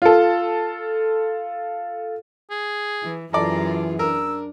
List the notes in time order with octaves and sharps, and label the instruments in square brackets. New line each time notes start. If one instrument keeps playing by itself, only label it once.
[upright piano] F4 A4
[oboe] G#4
[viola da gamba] E3
[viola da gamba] F#2 F4 G#4 [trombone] E3 [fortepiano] A4 D5 [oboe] A#5
[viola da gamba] D4 [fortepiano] A#4 [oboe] E6